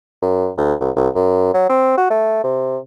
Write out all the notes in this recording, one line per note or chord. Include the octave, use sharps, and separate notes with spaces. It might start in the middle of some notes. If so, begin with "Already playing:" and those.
F#2
D2
C2
C2
F#2
F#3
C4
F#4
A3
C3